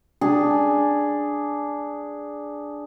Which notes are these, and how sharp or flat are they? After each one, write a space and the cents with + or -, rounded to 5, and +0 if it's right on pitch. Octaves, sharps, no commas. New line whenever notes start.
D4 +0 G#4 +0